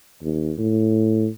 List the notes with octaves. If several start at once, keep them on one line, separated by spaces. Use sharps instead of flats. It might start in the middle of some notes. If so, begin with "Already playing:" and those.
D#2
A2